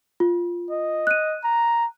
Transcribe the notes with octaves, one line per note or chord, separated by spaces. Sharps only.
F4
D#5
F#6 D#7
A#5